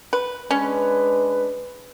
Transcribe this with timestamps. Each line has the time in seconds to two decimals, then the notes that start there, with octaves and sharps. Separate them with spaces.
0.13 B4
0.51 G#3 C#4 D4 B4